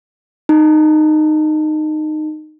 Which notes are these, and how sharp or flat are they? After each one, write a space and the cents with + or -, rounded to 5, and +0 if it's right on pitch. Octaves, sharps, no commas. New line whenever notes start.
D#4 -15